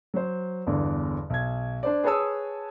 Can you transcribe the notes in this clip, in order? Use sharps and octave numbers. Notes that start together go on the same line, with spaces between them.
F#3 C5
G1 E2 D3
B1 G#6
D4 C5 D5
G#4 B4 C#5 A5 D#6 E6